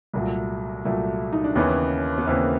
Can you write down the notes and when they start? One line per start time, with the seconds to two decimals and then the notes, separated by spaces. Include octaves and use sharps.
0.14 C2 A#2 F#3 A3
0.85 C2 A#2 F#3 A3
1.33 D#4
1.44 D4
1.55 D#2 C#3 E3 B3 C#4
2.18 B3
2.27 D#2 C#3 E3 A#3 C4